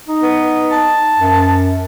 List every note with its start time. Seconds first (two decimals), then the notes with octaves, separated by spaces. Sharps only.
0.08 D#4
0.22 B3
0.71 A5
1.19 F#2